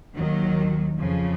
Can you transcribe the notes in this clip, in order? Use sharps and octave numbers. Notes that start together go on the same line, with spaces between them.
D#2 D#3 F#3
F2 C#3 F3